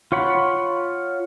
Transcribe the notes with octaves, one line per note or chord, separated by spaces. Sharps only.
F4 C#5 F#5 B5